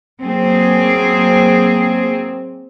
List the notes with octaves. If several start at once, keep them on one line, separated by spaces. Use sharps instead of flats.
F#3 A#3 C4 G#4